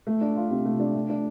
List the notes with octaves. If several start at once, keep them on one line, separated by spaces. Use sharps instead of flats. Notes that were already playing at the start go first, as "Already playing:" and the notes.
A3
D4
F4
C3
A3
D4
A3
D4